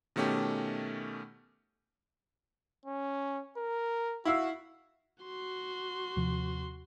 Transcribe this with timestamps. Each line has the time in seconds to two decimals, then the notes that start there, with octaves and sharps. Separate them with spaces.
0.16 B2 D#3 A3 C#4 G4
2.85 C#4
3.57 A#4
4.25 E4 F#4 F5 E6
5.24 F#4 C6
6.16 D#2 C3 F3